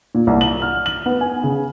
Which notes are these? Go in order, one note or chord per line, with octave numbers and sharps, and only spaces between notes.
A#2
C2
F#7
F6
F#7
B3
G#5
C#3